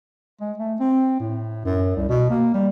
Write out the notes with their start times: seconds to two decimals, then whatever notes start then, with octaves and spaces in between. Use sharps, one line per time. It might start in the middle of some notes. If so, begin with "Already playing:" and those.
0.41 G#3
0.58 A3
0.80 C4
1.20 A2
1.65 F#2
1.96 C2
2.09 B2
2.30 A#3
2.54 G3